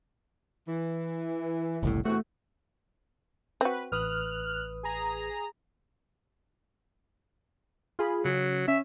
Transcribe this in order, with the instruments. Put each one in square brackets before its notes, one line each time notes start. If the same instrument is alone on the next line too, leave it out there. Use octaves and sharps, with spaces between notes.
[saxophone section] E3
[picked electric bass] F#1 C2 A2
[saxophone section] E2 C3 F#4 [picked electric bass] A3
[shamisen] C4 F#4 [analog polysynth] B4
[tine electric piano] A1 B4 D#6 [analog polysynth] F6 F#6
[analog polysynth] G#4 A#5
[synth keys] F4 G#4 B5
[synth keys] C#3 [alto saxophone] F#3
[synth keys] C#4 [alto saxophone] E5